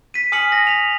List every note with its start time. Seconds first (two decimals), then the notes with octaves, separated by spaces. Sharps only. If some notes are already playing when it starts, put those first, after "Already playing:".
0.14 B6 D#7
0.32 G#5 D#6 F6 B6 C#7 F#7
0.52 A#6
0.67 B6 F7